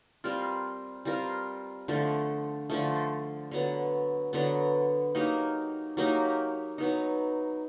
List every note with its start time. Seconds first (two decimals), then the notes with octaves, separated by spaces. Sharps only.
0.24 G3 C4 F4 A#4
1.05 G3 C4 F4 A#4
1.88 D3 F3 A3
2.70 D3 F3 A3
3.51 D3 F#3 B3
4.33 D3 F#3 B3
5.15 F#3 A#3 D#4 G4
5.97 F#3 A#3 D#4 G4
6.78 F#3 B3 D#4